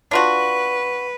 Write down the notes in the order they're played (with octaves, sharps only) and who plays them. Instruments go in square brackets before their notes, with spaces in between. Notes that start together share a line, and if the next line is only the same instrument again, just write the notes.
[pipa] D4 F4 F#4 [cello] B4